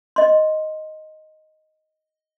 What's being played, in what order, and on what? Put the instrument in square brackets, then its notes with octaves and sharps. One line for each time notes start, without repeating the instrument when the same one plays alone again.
[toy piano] D#5 C6